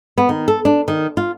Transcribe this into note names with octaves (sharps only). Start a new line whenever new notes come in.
B3
D#3
A4
D4
D#3
F4